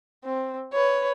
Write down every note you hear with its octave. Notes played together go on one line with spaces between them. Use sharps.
C4
B4 C#5